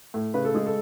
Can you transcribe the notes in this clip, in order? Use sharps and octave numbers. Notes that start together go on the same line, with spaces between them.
A2
C#3 B4
A4
G#3 G#4
A4